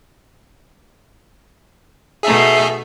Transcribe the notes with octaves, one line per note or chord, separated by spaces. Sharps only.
B2 A3 D#4 G#4 E5